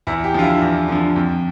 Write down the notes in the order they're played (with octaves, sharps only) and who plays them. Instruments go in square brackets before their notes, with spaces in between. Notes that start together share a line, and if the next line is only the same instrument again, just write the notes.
[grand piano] E2 E4
G4
D3 F3 F4
E4
E2
D3 F3
F2